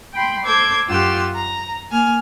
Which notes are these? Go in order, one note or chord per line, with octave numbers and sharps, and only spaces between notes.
G5 B5 C6
A4 C5 D6 E6 G6 G#6
F#2 F4 G4 F#5 C6 E6
A#5
A#3 G#5 F6